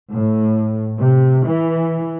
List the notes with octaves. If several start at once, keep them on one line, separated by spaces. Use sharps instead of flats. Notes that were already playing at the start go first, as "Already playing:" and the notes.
A2
C3
E3